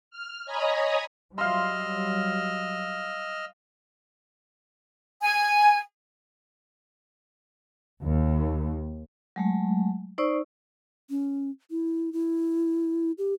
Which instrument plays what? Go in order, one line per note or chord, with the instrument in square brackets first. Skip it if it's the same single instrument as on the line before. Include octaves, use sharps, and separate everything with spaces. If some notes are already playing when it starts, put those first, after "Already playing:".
[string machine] F6
C#5 D#5 G#5 A#5 B5 D#6
[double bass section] F#3 G3 [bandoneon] D#5 E6 F6 [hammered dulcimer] F5 C6
[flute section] G#5
[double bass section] D#2
[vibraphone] F#3 G#3 A3
D#4 C5 D5 C#6 E6
[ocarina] C#4
E4
E4
G4